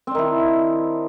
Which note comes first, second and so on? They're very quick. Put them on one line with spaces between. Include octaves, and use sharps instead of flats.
C4 D4 D#3 E4